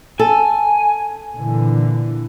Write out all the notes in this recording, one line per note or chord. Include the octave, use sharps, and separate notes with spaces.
A4 G#5
A#2 D3 E3